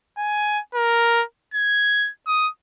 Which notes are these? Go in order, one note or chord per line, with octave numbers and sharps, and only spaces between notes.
G#5
A#4
G#6
D#6